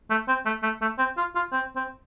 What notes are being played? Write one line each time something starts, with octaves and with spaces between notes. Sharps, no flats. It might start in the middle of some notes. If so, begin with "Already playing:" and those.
A3
C4
A3
A3
A3
C4
F4
F4
C4
C4